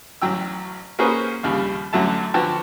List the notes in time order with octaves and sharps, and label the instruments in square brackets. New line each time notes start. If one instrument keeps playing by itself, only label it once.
[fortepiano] A1 F#3 G5 E6
A#3 C#4 F#4 G#4 B4 C5
A#1 D#2 C#3 G3
A1 F#2 D3 F#3 A3 A5
D3 F3 B3 F#4 G5 A5